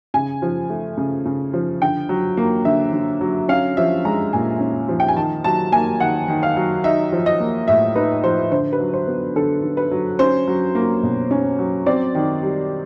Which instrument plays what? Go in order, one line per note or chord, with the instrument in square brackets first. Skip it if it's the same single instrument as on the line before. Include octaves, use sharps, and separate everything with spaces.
[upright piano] C#3 G#5
F3
A3
C#3
C#3
F3
D3 G5
F#3
A#3
D3 E5
D3
F#3
C#4 F5
F3 E5
G#3 A#5
A#2 G#5
C#4
F3
G5
G#5
D#3 A5
F#3 A5
A#3 G#5
D#3 F#5
D#3
F5
F#3
D#4 E5
F3
D#5
A#3
A2 E5
D#4 B4
F3 C5
D3 C5
B4
F#3
C5
B3
D3 A4
D3
B4
F#3
C#4 C5
F#3
A#3
B2
C#4
F#3
C4 D5
D#3
G3